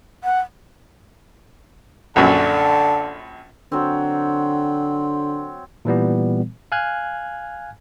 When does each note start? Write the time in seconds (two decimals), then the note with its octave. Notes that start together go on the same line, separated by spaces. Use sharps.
0.24 F#5
2.16 A#1 F#2 D3 A5
3.72 D3 F#3 C4
5.85 A#2 E3 G3 B3
6.72 F5 G#5 F6 F#6 G#6